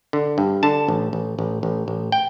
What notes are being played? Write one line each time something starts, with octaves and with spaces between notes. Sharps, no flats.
D3
G2
D3 A5
A1
A1
A1
A1
A1
G5